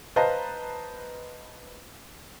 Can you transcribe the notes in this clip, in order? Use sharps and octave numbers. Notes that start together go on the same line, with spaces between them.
B4 C5 D#5 F5 A5 A#5